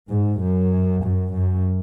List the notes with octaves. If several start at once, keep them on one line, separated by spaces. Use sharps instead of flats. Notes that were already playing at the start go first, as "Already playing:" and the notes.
G#2
F#2
F#2
F#2